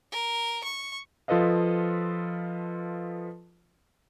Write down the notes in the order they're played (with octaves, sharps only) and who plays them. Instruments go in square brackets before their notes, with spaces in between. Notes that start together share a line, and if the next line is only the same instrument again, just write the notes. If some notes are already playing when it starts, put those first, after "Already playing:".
[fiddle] A#4
C#6
[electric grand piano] F3 F4 A4 B4 D#5 F5